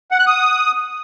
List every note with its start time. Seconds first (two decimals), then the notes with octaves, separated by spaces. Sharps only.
0.11 F#5
0.19 F#6
0.27 D#6